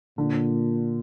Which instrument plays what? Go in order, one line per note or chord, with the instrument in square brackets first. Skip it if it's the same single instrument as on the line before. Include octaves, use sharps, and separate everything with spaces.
[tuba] A#2 [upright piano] D3